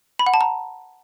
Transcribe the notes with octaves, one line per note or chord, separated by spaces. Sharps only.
B5
F#5
A5
A#5